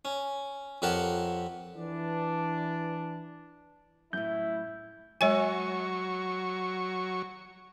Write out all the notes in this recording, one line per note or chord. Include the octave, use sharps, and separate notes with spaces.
C#4
F2 G4 A#4 C#5 F#5 A5
E3 D4
F#2 A2 E4 G6
F#3 G#3 C#5 G#5 C#6